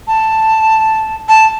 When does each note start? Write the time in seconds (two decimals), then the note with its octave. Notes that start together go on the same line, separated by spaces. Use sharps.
0.07 A5
1.28 A5